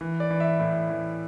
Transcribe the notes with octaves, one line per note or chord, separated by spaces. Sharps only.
E3
D5
E3
E5
A2
E3